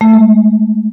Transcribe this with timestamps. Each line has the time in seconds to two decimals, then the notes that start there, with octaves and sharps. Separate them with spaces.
0.01 A3
0.14 G#3